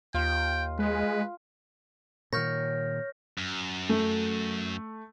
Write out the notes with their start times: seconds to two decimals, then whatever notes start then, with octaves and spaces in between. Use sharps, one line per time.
0.14 D#2 F4 G5
0.79 G#3 B4
2.33 A#2 D#3 C#5 F6 G6 A#6
3.38 F#2
3.89 A3